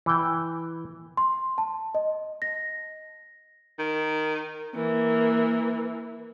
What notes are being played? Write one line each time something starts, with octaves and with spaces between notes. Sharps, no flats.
E3 G5
C6
A5
D#5
A#6
D#3
E3 A#3